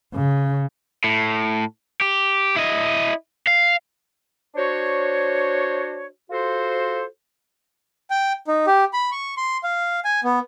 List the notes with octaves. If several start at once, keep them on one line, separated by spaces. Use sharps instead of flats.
C#3
A2
G4
E4 D#5
F5
D4 F#4 C5 C#5
F4 F#4 A4 C5
G5
D#4
G4
B5
C#6
C6
F5
G#5
B3